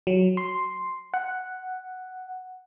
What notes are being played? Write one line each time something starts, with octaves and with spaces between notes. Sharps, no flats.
F#3
C6
F#5